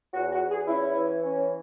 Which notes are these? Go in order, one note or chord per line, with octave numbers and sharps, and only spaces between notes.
E2 F#4
F#4
E2
G#4
C#4 E4
E3
C#4